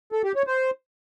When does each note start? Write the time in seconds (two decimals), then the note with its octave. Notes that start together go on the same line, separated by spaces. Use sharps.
0.12 A4
0.24 G4
0.35 C#5
0.47 C5